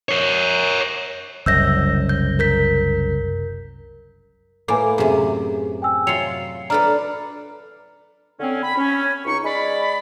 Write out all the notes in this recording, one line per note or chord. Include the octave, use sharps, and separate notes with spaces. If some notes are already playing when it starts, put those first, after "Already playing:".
A#4 C#5
F#1 C2 F#2 E6 G6 A#6
G6
A#4 G6 B6
A2 A#3 B4 G#5 D6
F#2 C3 G#4
G5 G#5 E6
F#3 F4 C7 C#7 F7
D4 A4 B4 A#5 F6
D3 C4 C#4
B5
C#4
C#2 D#4 C#6
G#3 D5 B5